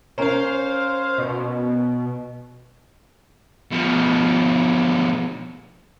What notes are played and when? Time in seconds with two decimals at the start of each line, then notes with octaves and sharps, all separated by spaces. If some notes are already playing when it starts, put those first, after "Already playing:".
0.18 C#4 A#4 C5 C#5 F5
1.18 B2
3.72 B2 F3